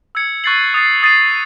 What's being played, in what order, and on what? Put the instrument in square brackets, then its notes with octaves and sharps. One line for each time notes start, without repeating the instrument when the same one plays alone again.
[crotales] E6 G#6 C#7
C#6 F#6 A6 C7 F#7
D#6 A6 C7
D#6 A6 C7 D#7